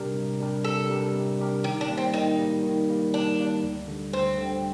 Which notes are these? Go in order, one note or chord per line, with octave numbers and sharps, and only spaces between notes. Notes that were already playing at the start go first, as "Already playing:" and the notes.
Already playing: C3 G3 D4 G4 A#4
C3
G3 D4 G4 A#4
C3 A4
G3 D4 G4 A#4
C3
G3 D4 G4 A#4
D#3 G4
D4
G3 A#3
C4
D#3 D#4
G3 A#3
D#3
G3 A#3
D#3 D4
G3 A#3
D2
D3 G3
D2 C4
D3
G3